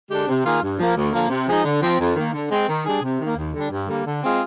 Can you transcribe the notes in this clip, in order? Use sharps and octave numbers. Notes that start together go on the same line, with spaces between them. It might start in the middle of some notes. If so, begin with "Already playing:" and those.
D3 G#3 D4 G4
C3
D#3 A#3 F4 G#4
G2
F3 A#3
D2
D3 F3 A#3
C3
F3 G#3 D#4 G#4
D3
F3 C4
F2
D#3 A#3
D3
G#3 C4
D#3
G3 D4 G#4
C3
D#3 A#3
D#2
D3 G3 D4
G2
D3 G3 A#3
D3
G#3 C4 F4 G#4